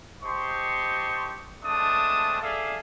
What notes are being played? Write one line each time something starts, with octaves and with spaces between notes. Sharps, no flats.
G4 C5 D#5 A5 C6 C#6
G#3 A3 C4 D4 A5 D#6
G#4 A4 D5 E5 F5